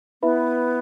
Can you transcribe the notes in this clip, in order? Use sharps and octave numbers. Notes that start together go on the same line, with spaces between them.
B3 E4 B4 E5 B5